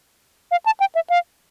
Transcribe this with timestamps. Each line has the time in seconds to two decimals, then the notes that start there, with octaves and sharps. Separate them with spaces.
0.51 F5
0.66 A5
0.80 G5
0.95 E5
1.10 F5